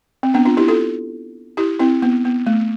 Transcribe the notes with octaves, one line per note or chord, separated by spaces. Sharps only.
C4
B3 D4
D4 F4
E4 G4
F4 A4
E4 G4
C4 E4
B3
B3
A3